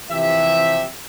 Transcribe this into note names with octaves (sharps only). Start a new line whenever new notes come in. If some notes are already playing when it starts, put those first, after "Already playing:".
C3 E3 F3 G4 E5